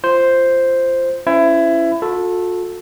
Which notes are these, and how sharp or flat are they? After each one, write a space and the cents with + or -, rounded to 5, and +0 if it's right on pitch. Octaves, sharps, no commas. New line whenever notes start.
F4 -15 C5 +0
C#4 +0 E4 +20 C5 -35
F#4 -45 A4 +0